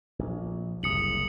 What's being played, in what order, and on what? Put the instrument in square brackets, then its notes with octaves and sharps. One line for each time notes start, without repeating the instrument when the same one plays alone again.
[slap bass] A#1
[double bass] F#1 C3 [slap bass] C2 [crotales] D#6 C#7 F#7